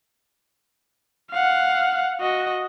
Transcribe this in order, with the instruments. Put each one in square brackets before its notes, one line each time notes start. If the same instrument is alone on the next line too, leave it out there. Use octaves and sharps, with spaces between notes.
[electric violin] F5 F#5
F#4 D#5